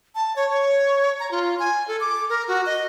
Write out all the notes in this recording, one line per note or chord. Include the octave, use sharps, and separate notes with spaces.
A5
C#5
C#5
A#5
F4
G#5
A4
D6
A#4
F#4
D#5